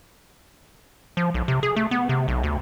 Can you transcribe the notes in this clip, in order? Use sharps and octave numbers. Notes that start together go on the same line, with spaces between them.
F3
B1
C3
G#4
A3
B3
C3
B1
D2